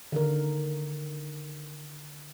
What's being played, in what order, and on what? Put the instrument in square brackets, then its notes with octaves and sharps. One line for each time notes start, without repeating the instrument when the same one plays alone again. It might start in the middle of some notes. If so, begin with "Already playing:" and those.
[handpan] D3 D#3 A#4